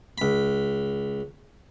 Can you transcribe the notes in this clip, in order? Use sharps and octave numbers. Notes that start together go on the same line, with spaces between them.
C#2 B5